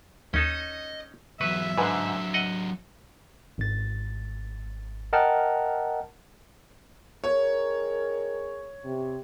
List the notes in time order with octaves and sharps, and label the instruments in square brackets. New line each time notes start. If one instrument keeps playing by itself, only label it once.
[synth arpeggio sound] D#2 [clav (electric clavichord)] C#4 D#4 A4 [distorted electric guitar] D#5
[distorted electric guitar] E2 F#3 [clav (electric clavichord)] B4 [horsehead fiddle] E5 [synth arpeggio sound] C#6
[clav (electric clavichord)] G#2 D3 [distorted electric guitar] F#3 D4 [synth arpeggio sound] B4 G#5 B5
[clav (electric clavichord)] D#5 F#5
[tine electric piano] G#1 A6
A#4 D#5 F#5 G5 A5 F6
[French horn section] D#3 G#4 A#4 [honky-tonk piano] C#5
[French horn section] C3